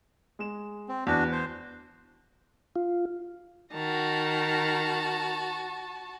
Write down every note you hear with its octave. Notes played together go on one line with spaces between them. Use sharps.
G#3 E7
C4
E2 D4 F#4
C5
F4
D#3 F#4 A5 A#5